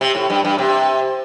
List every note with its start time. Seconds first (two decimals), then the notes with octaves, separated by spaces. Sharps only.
0.01 C3
0.15 A2
0.30 G2
0.45 G2
0.58 C3